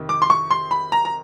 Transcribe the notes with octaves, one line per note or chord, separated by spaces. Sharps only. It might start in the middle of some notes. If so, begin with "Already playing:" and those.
Already playing: F2 C3 D#3
D6
C6
C#6
C6
B5
A#5
A#5